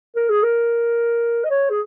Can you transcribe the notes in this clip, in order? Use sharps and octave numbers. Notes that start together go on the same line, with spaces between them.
A#4
G#4
A#4
D#5
C#5
G#4